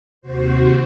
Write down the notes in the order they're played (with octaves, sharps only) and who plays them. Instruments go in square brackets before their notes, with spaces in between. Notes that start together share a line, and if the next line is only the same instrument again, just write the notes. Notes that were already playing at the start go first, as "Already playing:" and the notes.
[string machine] D#2 C3 F#4 C5